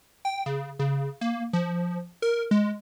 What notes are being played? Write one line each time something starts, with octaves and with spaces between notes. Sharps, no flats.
G5
C#3
C#3
A#3
F3
A#4
G#3